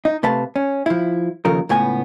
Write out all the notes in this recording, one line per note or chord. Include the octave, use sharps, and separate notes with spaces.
D#4
C3 A3 B4 F5 A5
C#4
F3 E4
D#2 C#3 F3 D#4 A4 A#4
C#2 A2 B3 G#5